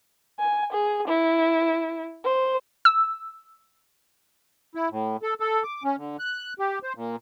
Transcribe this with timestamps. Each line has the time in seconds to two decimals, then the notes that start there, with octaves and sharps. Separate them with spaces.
0.39 G#5
0.72 G#4
1.08 E4
2.24 C5
2.85 E6
4.75 E4
4.91 A2
5.23 A4
5.40 A4
5.63 D6
5.84 C#4
5.97 D3
6.19 F#6
6.59 G4
6.83 C5
6.95 A#2